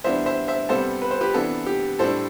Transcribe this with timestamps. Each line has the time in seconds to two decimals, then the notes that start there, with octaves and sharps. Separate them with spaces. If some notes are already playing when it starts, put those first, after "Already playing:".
0.04 E3 G3 B3 D4 C5 E5
0.26 C5 E5
0.48 C5 E5
0.69 C3 G3 B3 A4 C5
1.02 B4
1.11 C5
1.21 G4 B4
1.34 C3 E3 B3 D4 A4
1.66 G4
1.99 A2 G3 D4 A4 C5